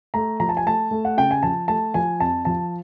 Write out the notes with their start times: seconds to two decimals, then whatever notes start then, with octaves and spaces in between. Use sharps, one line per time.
0.14 A3 A#5
0.40 F3 A#5
0.49 A5
0.57 G#5
0.66 A3 A5
0.91 A3
1.05 F#5
1.17 C#3 G5
1.31 G#5
1.43 F3 A5
1.68 A3 A5
1.94 F3 G#5
2.20 F2 A5
2.45 F3 A5